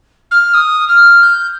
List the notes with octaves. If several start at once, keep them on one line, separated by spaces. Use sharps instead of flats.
F6
D#6
F6
G6